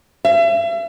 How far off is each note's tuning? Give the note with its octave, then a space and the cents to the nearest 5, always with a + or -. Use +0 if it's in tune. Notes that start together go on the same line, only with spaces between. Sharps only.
E5 +40